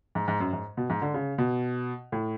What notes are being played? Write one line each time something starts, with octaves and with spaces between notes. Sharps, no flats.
G#2
G#2
F#2
G#2
B2
G#2
D3
C#3
B2
A2